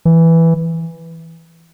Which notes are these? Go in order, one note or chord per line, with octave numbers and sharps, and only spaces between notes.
E3